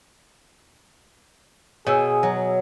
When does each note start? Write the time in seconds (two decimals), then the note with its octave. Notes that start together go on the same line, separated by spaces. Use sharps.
1.87 B2 G#4 C#5 G#5 E6
2.23 F#3